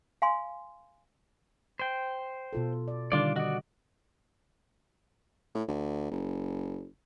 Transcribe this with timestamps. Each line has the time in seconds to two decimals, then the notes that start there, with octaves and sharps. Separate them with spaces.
0.22 F5 G#5 C6
1.79 C5 G5
2.53 B2 F4 A4
2.88 D5
3.12 D3 D#3 G3 D4 F4 D5
3.36 F#4 D5 D#5
5.55 A2
5.68 D2
6.11 F#1